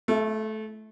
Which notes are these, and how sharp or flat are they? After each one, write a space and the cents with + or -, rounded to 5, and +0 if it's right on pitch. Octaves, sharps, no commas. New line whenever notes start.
A3 -20 E4 +35